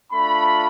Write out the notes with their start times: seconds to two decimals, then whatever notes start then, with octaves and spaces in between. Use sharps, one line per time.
0.12 A3 D4 F4 B5